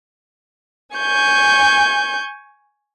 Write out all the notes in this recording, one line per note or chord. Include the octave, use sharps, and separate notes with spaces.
G#5 C#6 G6